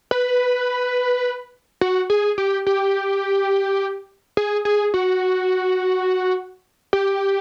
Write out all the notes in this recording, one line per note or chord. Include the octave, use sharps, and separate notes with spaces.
B4
F#4
G#4
G4
G4
G#4
G#4
F#4
G4